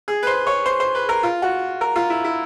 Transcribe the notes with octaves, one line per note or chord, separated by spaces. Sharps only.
G#4
B4
C5
C#5
C5
C5
B4
A#4
F4
F#4
A#4
F4
E4
E4